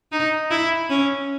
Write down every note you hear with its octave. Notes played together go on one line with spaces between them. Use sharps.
D#4
E4
C#4